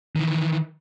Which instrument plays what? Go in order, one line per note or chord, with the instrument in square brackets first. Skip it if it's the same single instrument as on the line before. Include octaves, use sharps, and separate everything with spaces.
[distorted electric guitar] D#3 E3